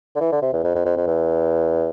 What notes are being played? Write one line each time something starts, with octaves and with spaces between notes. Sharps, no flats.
D3
E3
D3
C3
E2
F2
F2
F2
F2
E2